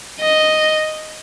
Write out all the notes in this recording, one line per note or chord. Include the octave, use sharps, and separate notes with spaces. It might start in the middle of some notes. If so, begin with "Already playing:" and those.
D#5